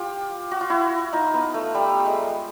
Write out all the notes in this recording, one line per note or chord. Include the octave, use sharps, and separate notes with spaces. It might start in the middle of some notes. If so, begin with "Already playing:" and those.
Already playing: F4 G4
F#4
F4
E4 F#4
D#4 F4
B3
A3
G3
G#3